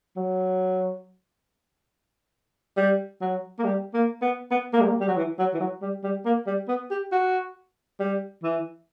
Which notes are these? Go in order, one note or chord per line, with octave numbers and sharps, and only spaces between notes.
F#3
G3
F#3
A#3
G3
A#3
B3
B3
A#3
G3
A#3
G3
F#3
E3
F#3
E3
F#3
G3
G3
A#3
G3
B3
G4
F#4
G3
E3